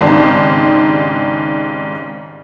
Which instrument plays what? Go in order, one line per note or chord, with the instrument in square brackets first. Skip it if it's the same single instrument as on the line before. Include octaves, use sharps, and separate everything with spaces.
[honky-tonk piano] G#1 G#2 C#3 D4 D#4 G4